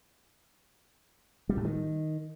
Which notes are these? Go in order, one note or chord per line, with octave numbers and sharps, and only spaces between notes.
G3
A2
D#3